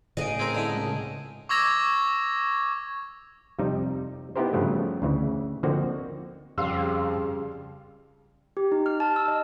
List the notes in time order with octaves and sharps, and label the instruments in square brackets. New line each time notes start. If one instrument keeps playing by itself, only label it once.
[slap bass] A2 C#3 [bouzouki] D#4 G#4 [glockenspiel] D7 D#7
[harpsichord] C4 A#4 [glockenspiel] G#6 D#7
[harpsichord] D3 E4 [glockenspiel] A5 F7
[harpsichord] C#2
[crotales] C#6 D6 E6 G#6 A#6 F7
[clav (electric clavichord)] F2 C3 G3 D#4
B3 D#4 E4 G4 A#4 C5
G2 C#3 F3 F#3 A3
D2 C#3 E3
D3 F3 A#3 C4 D#4 F#4
[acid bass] F2 [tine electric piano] C#3 G3 G4 [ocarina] G#4 [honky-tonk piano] F5 C6 E6
[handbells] G4
D#4
F6
A5
E6
D#5